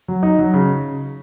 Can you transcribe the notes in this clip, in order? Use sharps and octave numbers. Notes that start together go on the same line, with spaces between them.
F#3
D#4
F#3
C#3